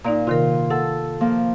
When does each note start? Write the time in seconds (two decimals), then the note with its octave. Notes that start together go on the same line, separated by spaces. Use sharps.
0.04 A#2 D#4 D5 A#5
0.27 C3 D#3 F4 A#4
0.70 A4 F#5
1.21 F3 A#3